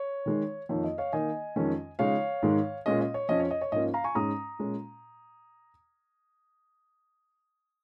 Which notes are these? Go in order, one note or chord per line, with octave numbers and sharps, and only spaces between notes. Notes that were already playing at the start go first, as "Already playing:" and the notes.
Already playing: C#5
D#3 G#3 D#4
F2 D#3 A#3 D#4 C#5
D#5
C#5 F5
D#3 A#3 D#4 D#5 G#5
F2 D#3 G#3 C#4
C#3 F3 G#3 D#4 C#5 F5
G#2 D#3 G#3
A#2 G#3 C#4 D#5
D#5
C#5
F2 F3 C#4 D#5
C#5
D#5
C#5
G#2 F3 A#3 C#4 D#5
F5 A#5
G#5 C#6
G#2 G#3 C#4 A#5 D#6
A#2 G#3 C#4